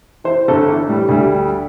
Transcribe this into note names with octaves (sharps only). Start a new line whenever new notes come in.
E3 C5
G1 A4
E3
A2 G3
D2 G3